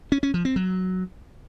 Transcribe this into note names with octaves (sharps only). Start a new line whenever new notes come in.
C#4
C#4
F3
C4
F#3